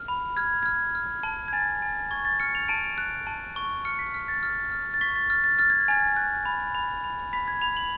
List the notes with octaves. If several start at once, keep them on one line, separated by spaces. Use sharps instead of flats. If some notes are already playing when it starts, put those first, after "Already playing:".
Already playing: F6
B5
F6 G#6
F6 G#6
F6
A5
G#6
G#5 A6
G#5
C#6 G#6
A6
F6 C#7
F7
A5 D7
F#6
A5
C#6
F6 C#7
B6
F6 B6
A6
F6 A6
F6
A6
C#6 B6
A6
F6 A6
A6
F6 A6
G#6
G#5 G#6
F#6
B5
B5
B5
B5 B6
G#6
B5 F7
F#7